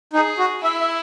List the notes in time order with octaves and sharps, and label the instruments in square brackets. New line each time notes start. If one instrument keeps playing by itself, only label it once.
[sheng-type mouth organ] D#4 [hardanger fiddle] G#4
[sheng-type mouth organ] F#4
[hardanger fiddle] E4 [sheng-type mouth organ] E5
[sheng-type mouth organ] E5